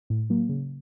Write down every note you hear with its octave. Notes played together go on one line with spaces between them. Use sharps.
A2
F#3 A#3
C#3